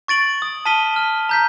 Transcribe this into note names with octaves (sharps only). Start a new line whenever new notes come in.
C#6 A6 D7 F#7
D#6
A5 D#6 F6 B6 D#7 G7
F6
A#5 G6 B6